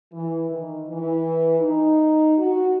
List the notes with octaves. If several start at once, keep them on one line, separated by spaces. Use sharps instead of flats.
E3
D#3
E3
D#4
F#4